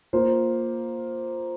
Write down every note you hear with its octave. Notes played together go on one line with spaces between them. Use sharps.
A#3 F4 C5